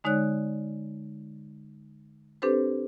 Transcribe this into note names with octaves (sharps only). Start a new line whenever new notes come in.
D3 G#3 D#4 C#5 D5 F#6
C4 D4 G4 A4 B4 C5